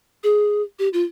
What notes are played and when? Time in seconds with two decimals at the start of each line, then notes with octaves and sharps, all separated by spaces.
0.24 G#4
0.79 G4
0.93 F4